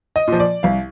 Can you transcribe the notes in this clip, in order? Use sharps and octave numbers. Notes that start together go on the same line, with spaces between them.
D#5
A#2 F3
D5
C2 F5